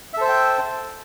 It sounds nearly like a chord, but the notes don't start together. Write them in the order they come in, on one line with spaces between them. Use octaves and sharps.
E5 A4 C5 A5 G5